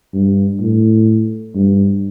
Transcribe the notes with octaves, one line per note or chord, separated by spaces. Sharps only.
G2
A2
G2